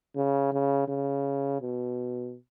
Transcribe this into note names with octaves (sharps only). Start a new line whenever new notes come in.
C#3
C#3
C#3
B2